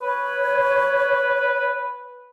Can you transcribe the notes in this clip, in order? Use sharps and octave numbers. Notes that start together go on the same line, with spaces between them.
B4 C#5